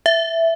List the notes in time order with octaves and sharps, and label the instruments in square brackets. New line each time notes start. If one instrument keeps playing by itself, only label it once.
[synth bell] E5